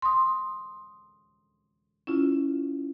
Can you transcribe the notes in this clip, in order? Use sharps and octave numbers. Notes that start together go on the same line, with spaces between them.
C6 D#6
C#4 E4 F4